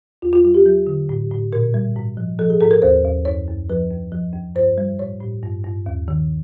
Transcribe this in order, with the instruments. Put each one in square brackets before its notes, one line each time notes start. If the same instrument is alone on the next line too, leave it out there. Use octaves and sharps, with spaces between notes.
[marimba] E2 F4
F4
F#3 F4
G4
F#3 G4
D3
A2
A2
A#2 A#4
G3
G#2
F3
F3 A4
G#4
G#2 A4
A#4
D#2 C5
D#2
F#2 C#5
F#2
F3 B4
F2
F3
F2
G2 C5
G3
A2 C#5
A2
G2
G2
D#2
D#3